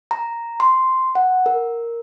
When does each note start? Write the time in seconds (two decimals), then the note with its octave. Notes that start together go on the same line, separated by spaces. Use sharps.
0.11 A#5
0.60 C6
1.15 F#5
1.46 A#4